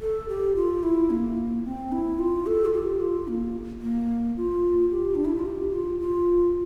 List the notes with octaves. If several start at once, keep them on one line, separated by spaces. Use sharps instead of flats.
A4
G4
F4
E4
A#3
C4
E4
F4
A4
F4
G4
F4
A#3
A#3
F4
G4
D4
E4
F4
G4
F4
F4